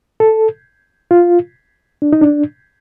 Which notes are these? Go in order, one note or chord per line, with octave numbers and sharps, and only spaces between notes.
A4
F4
D4
D#4
D4